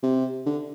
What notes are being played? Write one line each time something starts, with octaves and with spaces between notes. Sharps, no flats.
C3
D3